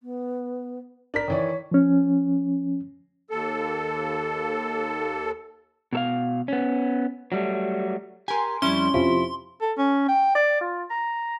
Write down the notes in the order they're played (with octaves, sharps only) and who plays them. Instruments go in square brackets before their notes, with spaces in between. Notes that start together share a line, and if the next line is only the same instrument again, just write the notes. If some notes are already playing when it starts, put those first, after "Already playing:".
[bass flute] B3
[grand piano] D4 A#4 B6
[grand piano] D#3 E3 D5 [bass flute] C#5
[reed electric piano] F3 C#4
[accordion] D#2 A4
[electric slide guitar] B2 A4 F5
B3 C#4
F#3 G3 A3
[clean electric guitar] G4 A#4 [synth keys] G#5 C6
[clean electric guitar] F2 G3 E4 [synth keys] C#4 [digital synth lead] C6
[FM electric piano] F2 C3 F3 [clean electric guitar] E4
[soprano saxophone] A4
C#4
G5
D5
F4
A#5